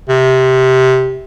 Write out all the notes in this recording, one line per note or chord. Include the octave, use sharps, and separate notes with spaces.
C3